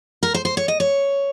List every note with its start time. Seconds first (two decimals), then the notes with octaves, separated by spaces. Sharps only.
0.23 A#4
0.34 C5
0.45 C5
0.57 C#5
0.68 D#5
0.80 C#5